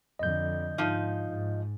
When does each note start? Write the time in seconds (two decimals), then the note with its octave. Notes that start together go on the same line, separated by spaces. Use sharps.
0.19 F2 D3 D#5 G6
0.78 G#2 F3 D#4
1.30 G#2